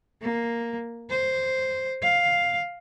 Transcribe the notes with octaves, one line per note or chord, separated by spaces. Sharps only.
A#3
C5
F5